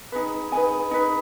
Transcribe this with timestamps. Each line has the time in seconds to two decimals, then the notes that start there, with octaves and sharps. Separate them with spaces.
0.12 D#4 G#4 B4
0.52 D#4 G#4 B4 G#5
0.91 D#4 G#4 B4